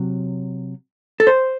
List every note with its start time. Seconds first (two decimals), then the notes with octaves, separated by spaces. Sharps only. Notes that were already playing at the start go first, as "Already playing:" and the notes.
Already playing: C3 F#3
1.20 A4
1.27 C5